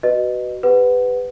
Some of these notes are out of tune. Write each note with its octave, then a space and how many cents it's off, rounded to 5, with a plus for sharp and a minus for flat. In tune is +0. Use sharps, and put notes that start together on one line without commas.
F#4 +25 B4 +0 D#5 -20
G4 +25 B4 +15 F#5 +0